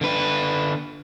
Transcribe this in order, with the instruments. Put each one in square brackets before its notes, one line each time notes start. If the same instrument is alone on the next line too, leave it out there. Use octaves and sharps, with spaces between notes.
[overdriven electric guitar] D3 B4